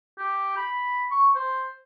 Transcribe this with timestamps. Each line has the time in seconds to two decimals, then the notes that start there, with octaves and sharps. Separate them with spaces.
0.18 G4
0.57 B5
1.11 C#6
1.35 C5